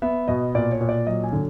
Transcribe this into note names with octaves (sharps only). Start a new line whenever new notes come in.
B3 E5
B2 D#5
A#2 D5
C#5
A#2
D5
F#3 D#5
G#5
D3